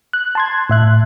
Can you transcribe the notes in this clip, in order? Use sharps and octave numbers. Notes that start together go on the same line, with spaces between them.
F#6
A5 C6 G#6
A2 E5 F#6